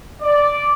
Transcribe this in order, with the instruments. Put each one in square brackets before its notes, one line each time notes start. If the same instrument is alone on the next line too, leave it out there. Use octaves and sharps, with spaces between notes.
[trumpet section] D5